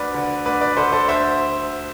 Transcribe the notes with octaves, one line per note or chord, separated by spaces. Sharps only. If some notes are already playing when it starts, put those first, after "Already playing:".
Already playing: D2 B4 D5
D3
D2 B4 D5
B4 D5
D3 A4 C5
A4 C5
D2 C5 E5